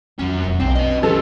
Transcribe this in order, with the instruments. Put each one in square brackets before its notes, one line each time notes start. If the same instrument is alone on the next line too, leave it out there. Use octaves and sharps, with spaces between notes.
[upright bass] F2 [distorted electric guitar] F#3 C#4
[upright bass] E1
[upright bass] B1 [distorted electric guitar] C4
[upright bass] C#4 D4 [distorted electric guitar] B4 D#5
[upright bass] E3 F3 [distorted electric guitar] C#4 G4 [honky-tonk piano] A4